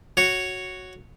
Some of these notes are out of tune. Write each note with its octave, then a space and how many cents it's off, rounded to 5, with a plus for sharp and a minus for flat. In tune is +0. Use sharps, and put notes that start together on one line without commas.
F#4 +0 C#5 +0